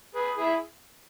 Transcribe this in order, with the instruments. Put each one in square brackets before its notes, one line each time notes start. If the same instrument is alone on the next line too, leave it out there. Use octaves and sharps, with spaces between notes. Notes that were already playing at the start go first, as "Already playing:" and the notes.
[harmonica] G#4 B4
E4 G#4